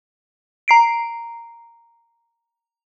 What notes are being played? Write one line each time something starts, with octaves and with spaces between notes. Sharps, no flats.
A#5 C7 D7